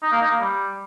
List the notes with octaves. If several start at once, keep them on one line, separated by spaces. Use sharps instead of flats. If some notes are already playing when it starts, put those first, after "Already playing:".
D#4
A#3
D#4
A#3
G3